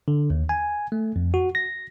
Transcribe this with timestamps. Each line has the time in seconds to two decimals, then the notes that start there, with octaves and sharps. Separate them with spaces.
0.08 D3
0.30 D#2
0.49 G#5
0.92 A3
1.16 F2
1.34 F#4
1.55 A#6